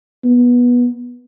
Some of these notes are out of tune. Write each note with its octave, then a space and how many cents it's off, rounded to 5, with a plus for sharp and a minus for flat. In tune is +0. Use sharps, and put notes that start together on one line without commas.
B3 -15